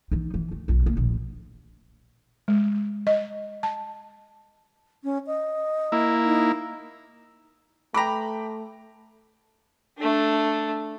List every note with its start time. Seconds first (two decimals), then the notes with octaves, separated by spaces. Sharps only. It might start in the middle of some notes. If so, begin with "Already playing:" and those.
0.11 E3 D#4
0.34 E3
0.51 D2
0.68 B1 F4
0.83 C3 A#3
0.95 D1 A#1
2.48 G#3
3.07 D#5
3.63 A5
5.04 C#4
5.27 D#5
5.92 A#3 E4
6.25 D#4
7.94 A3 B4 G5 A#5 B5 D6
9.99 A3 D4